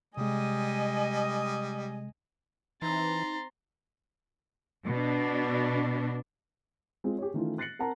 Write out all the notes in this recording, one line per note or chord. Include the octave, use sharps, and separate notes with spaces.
C3 G3 G#3 D#5 G#5 D#6
E3 C4 D#4 A#5 C6 A6
B2 D4
G#3 C4 F4
G4 G#4 C#5
D#3 E3 A3 C#4 E4 F4
F#6 A6 A#6 C7 C#7 F#7
C4 A#4 F#5 A5 A#5